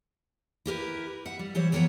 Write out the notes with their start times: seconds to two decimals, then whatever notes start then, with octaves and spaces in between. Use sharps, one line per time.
0.66 E4 G4 A#4 B4
1.25 E5 F#5
1.39 G3
1.55 E3 F#3 G3 C5 C#5
1.72 F2 E3 B3 A#4 C#5 F#5